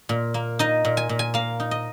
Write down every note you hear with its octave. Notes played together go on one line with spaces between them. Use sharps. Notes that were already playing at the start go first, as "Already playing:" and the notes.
A#2
A#3
D#4 D#5
A#2
G#5
A#2
G#5
A#3 F5
D#4
D#5